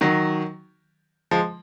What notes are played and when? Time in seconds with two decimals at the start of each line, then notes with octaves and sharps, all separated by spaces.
0.01 D#3 F#3
1.31 F3 G#3